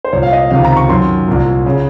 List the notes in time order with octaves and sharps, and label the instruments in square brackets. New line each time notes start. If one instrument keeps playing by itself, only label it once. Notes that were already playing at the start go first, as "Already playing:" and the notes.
[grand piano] C5
C2 A#2 C#5
F5
D#5
C#2 C3 D#3 F5
A#5
C#6
F#2 D#3 C6
C2 A#2
C#3